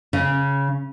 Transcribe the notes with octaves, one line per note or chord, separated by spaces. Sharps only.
C#3